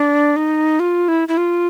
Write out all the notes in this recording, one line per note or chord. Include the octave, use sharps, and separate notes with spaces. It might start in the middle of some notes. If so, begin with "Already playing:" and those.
Already playing: D4
D#4
F4
E4
E4
F4